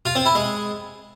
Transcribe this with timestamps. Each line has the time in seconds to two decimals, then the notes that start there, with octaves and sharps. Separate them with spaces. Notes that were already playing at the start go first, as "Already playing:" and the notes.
0.06 F4
0.15 C4
0.25 E4
0.35 G#3